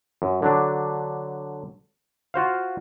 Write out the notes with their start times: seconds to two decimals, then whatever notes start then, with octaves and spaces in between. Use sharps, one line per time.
0.22 F#2
0.42 D3 F#3 D4
2.34 F4 F#4 C5 F5